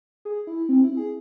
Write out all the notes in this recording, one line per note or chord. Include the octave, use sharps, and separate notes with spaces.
G#4
E4
C4
E4
G#4